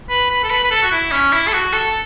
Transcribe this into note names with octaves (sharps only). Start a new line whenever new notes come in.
B4
B4
A4
B4
B4
A4
F#4
E4
C#4
E4
A4
F#4
A4